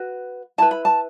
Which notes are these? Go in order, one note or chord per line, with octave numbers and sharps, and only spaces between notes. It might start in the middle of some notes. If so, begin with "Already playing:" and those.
Already playing: F#4 B4
E4 B4 A5
B5
A5